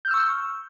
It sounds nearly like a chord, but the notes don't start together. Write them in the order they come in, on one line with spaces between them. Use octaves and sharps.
G6 F6 E6 C#6